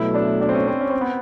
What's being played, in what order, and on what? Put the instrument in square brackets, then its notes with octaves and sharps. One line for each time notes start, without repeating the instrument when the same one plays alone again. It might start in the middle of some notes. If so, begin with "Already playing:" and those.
Already playing: [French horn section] B2 F#3 A3 [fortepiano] E4
[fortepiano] D4
D4
C4
C#4
C4
C#4
C4
B3